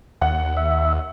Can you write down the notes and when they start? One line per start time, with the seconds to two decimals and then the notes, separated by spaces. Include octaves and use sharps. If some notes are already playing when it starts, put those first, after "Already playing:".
0.21 D#2 F#5
0.57 E5